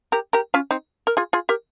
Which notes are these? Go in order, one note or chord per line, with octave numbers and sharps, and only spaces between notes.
G4 A#4
G4 A#4
C#4 F4
C4 D#4
A#4
F4 G#4
F4 G#4
G4 A#4